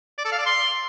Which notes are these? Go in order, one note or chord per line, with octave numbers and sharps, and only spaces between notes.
D5
A4
F5
D5
C6